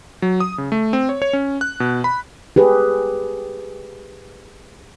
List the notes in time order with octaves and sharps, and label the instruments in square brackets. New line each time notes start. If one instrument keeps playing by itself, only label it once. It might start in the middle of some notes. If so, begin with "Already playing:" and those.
[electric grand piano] F#3
D#6
C#3
A3
C4
C#5
C#5
C#4
F#6
B2
B5
[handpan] G4 G#4 B4